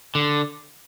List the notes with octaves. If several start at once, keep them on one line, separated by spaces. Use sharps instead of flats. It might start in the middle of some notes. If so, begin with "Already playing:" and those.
D3